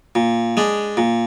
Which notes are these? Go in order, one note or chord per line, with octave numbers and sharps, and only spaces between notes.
A#2
G#3 D4
A#2